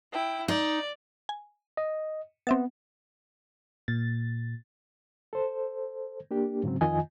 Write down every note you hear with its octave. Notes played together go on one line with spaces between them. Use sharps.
E4 G5
D#4 D5
G#5
D#5
B3 C4 E5 A6
A#2 A6
A4 C5
A#3 D4 G4
G#2 C#3 F#3 C4
F2 D#3 F4 D#5 G#5